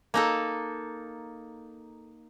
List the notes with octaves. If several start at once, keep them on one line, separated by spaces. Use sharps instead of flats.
A#3 D#4 A4